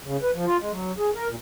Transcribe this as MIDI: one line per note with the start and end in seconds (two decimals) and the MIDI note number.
0.04 0.17 49
0.23 0.31 71
0.34 0.45 53
0.46 0.57 65
0.60 0.72 56
0.72 0.92 54
0.99 1.10 68
1.15 1.28 70
1.28 1.36 46